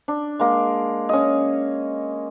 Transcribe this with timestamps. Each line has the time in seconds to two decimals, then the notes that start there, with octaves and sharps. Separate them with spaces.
0.08 D4
0.39 G#3 A#3
1.09 C#4 D#5